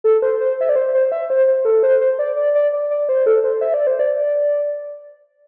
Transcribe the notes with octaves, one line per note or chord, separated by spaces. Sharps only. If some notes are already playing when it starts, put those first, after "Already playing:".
A4
C5
C5
E5
D5
C5
C5
E5
C5
C5
A4
C5
C5
D5
D5
D5
D5
D5
C5
A4
C5
E5
D5
C5
D5